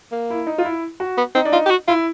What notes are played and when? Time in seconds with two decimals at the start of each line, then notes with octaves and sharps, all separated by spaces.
0.12 A#3
0.30 E4
0.47 D#4
0.58 F4
0.65 E4
1.00 F#4
1.18 B3
1.35 C4 D#4
1.45 D4
1.52 D#4 F4
1.66 G4
1.70 F#4
1.88 E4 F4